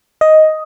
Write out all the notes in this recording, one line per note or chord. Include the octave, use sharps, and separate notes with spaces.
D#5